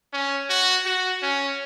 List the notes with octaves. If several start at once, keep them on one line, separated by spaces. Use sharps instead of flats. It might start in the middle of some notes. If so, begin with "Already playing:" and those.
C#4
F#4
F#4
C#4